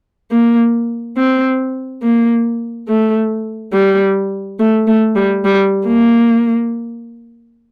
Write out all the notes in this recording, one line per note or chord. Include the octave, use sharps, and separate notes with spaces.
A#3
C4
A#3
A3
G3
A3
A3
G3
G3
A#3